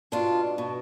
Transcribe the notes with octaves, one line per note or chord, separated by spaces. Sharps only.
B2 D4 F4
B2